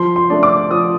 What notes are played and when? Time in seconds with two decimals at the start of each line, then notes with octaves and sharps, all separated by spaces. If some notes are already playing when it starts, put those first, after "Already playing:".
Already playing: F3 C6
0.16 C6
0.30 A3 D4
0.43 D6
0.71 F3 D#6